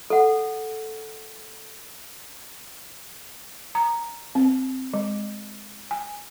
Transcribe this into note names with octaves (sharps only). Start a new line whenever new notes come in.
A4 F#5
A#5
C4
G#3
G#5